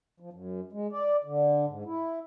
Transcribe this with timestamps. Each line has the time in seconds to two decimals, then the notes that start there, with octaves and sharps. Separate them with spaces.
0.20 F3
0.33 F#2
0.73 G#3
0.92 D5
1.24 D3
1.68 G#2
1.86 E4